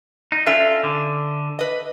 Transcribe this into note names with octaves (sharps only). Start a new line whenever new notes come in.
D#4
C#4 D4 F4 A4 E5
D3
B4 D#5